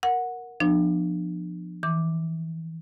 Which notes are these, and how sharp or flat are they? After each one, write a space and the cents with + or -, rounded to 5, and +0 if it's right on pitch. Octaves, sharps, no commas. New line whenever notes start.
A#4 +0 F#5 -10
F3 +0 B3 +0 D4 +35
E3 -20 D6 +0